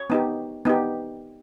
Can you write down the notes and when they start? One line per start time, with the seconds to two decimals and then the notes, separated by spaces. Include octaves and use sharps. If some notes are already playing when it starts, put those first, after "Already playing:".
Already playing: C#5
0.10 B3 D#4 G4
0.65 B3 D#4 G4